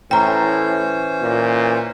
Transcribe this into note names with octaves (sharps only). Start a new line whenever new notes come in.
A2 E3 C#4 C5 G5 A#5
A#2